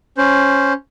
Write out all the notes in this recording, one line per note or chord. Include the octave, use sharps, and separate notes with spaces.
C#4 C5